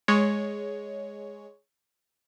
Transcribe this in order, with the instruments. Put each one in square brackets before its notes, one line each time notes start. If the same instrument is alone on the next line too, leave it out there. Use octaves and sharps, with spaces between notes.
[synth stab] G#3 C#5